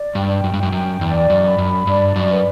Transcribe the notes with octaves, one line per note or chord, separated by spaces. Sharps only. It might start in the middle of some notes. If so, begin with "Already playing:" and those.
Already playing: D5
G2 G5
F#2
G2
F#2 G5
F#2
E2 D5
F#2
B5
F#2
G2 D5
F#2
B4